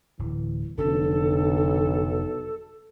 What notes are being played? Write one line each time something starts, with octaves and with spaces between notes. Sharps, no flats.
D1 E3
F1 B1 F2 D3 C#4 A4